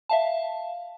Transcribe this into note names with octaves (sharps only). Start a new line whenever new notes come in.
E5 F5 A5